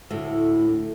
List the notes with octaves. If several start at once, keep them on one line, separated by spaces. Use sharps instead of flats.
D2 A2